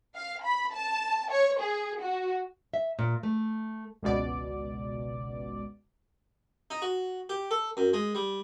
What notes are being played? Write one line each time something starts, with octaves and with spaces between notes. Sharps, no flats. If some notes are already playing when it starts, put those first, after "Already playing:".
F5
B5
A5
C#5
G#4
F#4
E5
A#2
A3
G#1 C#2 B2 D5
D#4
F#4
G4
A4
F#2
G#3
G3